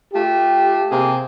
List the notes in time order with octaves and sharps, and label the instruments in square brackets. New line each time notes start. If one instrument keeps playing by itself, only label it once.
[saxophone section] A3 F4 [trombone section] G4
[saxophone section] C3 A#3 G#4